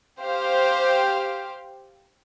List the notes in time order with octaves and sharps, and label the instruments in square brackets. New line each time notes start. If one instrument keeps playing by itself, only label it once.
[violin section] G4 C5 F5